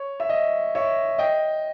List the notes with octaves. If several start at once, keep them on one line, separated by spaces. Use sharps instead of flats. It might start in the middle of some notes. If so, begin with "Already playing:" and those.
Already playing: C#5
E5
D#5
C#5 E5
D#5 G5